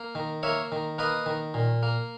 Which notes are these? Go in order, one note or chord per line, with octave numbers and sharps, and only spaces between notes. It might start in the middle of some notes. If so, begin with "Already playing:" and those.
Already playing: A#3
D#3
A#3 C#5 E5
D#3
A#3 B4 D#5
D#3
A#2
A#3